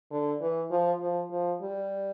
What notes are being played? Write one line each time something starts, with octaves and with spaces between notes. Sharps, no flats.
D3
E3
F3
F3
F3
G3